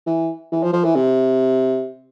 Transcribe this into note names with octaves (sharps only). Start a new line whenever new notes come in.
E3
E3
F3
F3
E3
C3